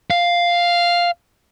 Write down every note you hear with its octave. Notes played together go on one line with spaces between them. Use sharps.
F5